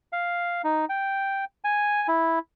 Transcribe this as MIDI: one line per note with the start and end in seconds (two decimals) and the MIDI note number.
0.13 0.62 77
0.64 0.85 63
0.89 1.45 79
1.64 2.07 80
2.08 2.39 64